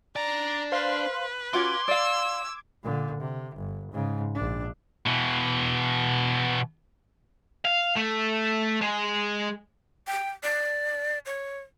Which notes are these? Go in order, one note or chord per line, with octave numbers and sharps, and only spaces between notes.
D4 D5 A#5
B4 C5 F5 C6
C#4 F4 F#4 C6 D6 G#6
D5 F5 E6
A#2 D3
C3
G1
G#2 C#3
A#1 D4
B2 E3
F5
A3
G#3
G5
D5
C#5